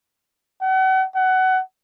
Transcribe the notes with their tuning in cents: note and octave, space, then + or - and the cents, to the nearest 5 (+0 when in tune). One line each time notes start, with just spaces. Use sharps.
F#5 +40
F#5 +20